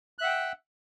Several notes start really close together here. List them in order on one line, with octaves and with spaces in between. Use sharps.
F#6 E5 F#5 G5 E6